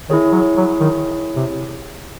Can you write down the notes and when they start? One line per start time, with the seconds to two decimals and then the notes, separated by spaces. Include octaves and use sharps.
0.09 D#3 E4 G#4 C#5
0.33 F#3
0.57 F#3
0.80 D#3
1.36 C3